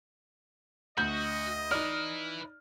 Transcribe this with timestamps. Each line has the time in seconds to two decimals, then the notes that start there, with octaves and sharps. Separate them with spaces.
0.98 D2 F#4 D#5 G6
1.71 D#4 E4 B4 D5 F6